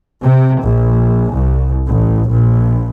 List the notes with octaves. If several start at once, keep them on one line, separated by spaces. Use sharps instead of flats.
C3
A#1
C2
A1
A#1